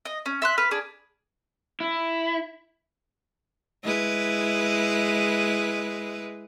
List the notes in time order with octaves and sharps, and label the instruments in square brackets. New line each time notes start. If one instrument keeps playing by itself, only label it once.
[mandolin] D#5
C#4
E5 C6 F#6
B4 F6
D4 G#4
[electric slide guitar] E4
[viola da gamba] G#3 E4 B4